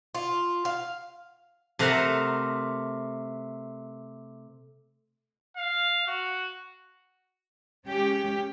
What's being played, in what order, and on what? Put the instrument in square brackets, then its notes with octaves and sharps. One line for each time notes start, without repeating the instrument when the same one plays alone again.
[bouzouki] F4
F5
[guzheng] C3 A3 A#4 F#5 A#5
[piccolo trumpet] F5
F#4
[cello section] G#3 C#4 G4